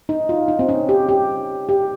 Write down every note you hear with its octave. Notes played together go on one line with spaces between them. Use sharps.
D#4
F4
D#4
C4
C#4
G4
G4
G4